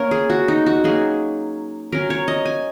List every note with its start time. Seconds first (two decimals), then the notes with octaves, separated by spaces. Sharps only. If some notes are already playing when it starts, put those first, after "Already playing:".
Already playing: A#3 C#4 A#4 C#5
0.11 G#4
0.30 F#4
0.48 D#4
0.66 F#4
0.84 F#3 A#3 C#4 G#4
1.92 F#3 C#4 A#4
2.10 C#5
2.28 D#5
2.46 G#5